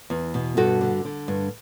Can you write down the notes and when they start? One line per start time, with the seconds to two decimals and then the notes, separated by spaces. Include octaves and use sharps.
0.10 E2
0.34 B2
0.57 G2 F#4 A4
0.81 D3
1.05 D3
1.28 G2